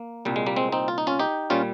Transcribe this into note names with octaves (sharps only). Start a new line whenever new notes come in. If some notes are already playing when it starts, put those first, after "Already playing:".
Already playing: A#3
C2 A#2 G3
G#3
G3 A#3
G#3 C4
C4 D#4
F4
D#4
C#4 F4
D#4 G4
A#2 G3 C#4 F4